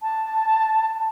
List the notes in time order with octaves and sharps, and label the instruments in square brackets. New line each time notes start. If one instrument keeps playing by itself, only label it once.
[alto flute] A5